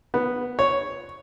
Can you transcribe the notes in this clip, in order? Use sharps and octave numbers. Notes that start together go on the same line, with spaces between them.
B3
C#5